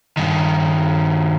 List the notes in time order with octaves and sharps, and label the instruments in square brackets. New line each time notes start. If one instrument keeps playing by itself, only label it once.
[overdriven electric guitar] G2 D#3